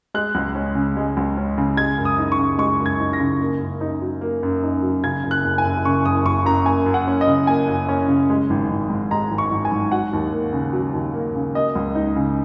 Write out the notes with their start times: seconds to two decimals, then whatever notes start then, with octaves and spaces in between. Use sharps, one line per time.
0.14 G#3 F#6
0.35 C#2
0.55 C#4
0.75 C#3
0.97 G#3
1.17 C#2
1.37 C#4
1.58 C#3
1.77 G#3 G#6
1.98 F#2
2.05 D#6
2.18 D#4
2.32 C#6
2.38 C#3
2.58 G#3 C#6
2.80 F#2
2.86 G#6
3.00 D#4
3.13 A#6
3.20 C#3
3.40 A#3
3.61 F#2
3.81 D#4
4.02 F#3
4.21 A#3
4.43 F#2
4.63 D#4
4.83 F#3
5.04 C#3 G#6
5.24 F#1
5.31 F#6
5.44 F#1
5.58 G#5
5.64 F#2
5.85 C#3 C#6
6.05 F#1 D#6
6.25 F#1 C#6
6.45 F#2 A#5
6.66 A#3 G#5
6.86 F#2
6.94 F#5
7.07 C#4
7.21 D#5
7.27 C#3
7.47 A#3 G#5
7.68 F#2
7.89 C#4
8.08 C#3
8.30 G#3
8.50 G#1
8.70 G#1
8.90 G#2
9.11 G#3 A#5
9.31 G#1
9.38 C#6
9.51 G#1
9.65 G#5
9.72 G#2
9.92 F#3 F#5
10.13 D#2
10.32 A#3
10.53 C#3
10.73 F#3
10.94 D#2
11.14 A#3
11.35 C#3
11.55 A#3 D#5
11.76 C#2
11.95 D#4
12.16 C#3